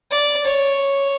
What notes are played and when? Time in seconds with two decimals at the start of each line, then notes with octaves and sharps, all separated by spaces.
0.12 D5
0.46 C#5